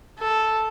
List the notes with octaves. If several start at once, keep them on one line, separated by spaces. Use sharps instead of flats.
A4